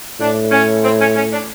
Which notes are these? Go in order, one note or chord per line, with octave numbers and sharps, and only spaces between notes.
A2 D4
C#4
C4
C#4
C#4
D4